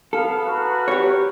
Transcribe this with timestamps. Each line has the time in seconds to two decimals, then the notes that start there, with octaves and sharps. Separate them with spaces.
0.13 B3 A4 F5
0.46 F#4 A#4 B4
0.88 G4 C#5